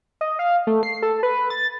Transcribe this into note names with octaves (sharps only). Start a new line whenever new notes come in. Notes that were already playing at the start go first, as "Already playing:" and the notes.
D#5
F5
A3
C7
A4
B4
A6